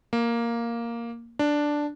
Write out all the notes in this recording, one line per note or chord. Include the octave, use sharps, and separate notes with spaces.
A#3
D4